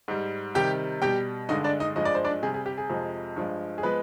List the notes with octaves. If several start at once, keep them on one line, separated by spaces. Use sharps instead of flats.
G#2 G3
C3 D#3 G3 G4 G5
B2 G3 G4 G5
G2 D3 G#3 D#4 D#5
D4 D5
D#4 D#5
G2 F3 G#3 D#5
D5
C5
D4 D5
C3 G3 G#4
G#4
G4
G#4
F2 C3 F3 G#3
G2 F3 G#3
G#4
F3 G#3 B3 B4